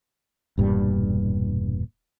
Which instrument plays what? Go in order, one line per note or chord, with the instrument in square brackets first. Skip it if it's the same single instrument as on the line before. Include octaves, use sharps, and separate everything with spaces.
[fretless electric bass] E1 G2 A#2 G3